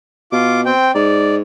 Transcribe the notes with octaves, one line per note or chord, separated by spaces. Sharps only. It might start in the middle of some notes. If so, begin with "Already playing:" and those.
B2 F4 D6
C4 G5
G#2 D5